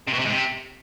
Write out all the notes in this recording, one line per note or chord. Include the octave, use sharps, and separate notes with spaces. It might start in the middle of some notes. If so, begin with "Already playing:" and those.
C3
B2
C3
G#2
C3